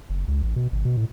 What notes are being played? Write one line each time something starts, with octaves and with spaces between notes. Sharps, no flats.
F#1
C#2
A1
B2
G#1
B2
A2